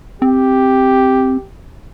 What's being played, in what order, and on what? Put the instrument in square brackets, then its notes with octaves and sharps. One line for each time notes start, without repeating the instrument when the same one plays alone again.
[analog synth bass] C4 [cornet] G4